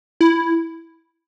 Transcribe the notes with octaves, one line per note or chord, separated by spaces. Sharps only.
E4